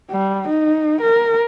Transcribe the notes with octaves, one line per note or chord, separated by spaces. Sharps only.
G3
D#4
A#4